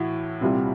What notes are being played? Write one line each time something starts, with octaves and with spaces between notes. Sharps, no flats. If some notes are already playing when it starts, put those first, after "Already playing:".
Already playing: A2 E3 E4 F#4
C2 A#2 G3 C4